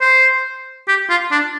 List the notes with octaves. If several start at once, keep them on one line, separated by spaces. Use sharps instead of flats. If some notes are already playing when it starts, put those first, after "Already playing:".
C5
G4
F4
D4